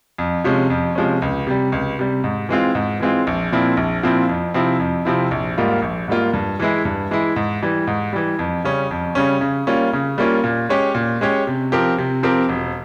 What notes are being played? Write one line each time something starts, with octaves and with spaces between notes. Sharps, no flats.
F2
C3 F3 G#3 C#4
F2
C3 F3 G#3 C#4
C#2
C3 G3
C#2
C3 G3
G#2
E3 G#3 C4 F4
G#2
E3 G#3 C4 F4
A#1
A#2 F3 C4 E4
A#1
A#2 F3 C4 E4
F2
C3 F3 C4 E4
F2
C3 F3 C4 E4
A#1
G#2 G3 A#3 F4
A#1
G#2 G3 A#3 F4
G2
E3 G#3 E4
G2
E3 G#3 E4
G#2
E3 G3
G#2
E3 G3
F2
C#3 G3 C#4
F2
C#3 G3 C#4
C#3
G3 A#3 C#4 F4
C#3
G3 A#3 C#4 F4
A#2
G#3 C#4 G4 C#5
A#2
G#3 C#4 G4 C#5
C3
F3 C4 G4 A#4
C3
F3 C4 G4 A#4
E1